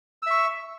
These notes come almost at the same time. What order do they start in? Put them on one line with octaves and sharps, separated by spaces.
E6 E5 C#6